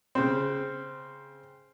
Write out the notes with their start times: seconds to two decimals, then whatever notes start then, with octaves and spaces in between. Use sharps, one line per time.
0.15 C#3 C4